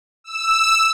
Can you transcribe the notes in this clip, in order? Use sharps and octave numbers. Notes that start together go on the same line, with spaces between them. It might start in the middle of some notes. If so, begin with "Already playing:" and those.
E6